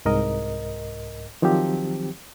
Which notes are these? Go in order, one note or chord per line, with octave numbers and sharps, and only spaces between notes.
C2 G#2 A#4 D#5
D#3 F3 F#3 C4 G4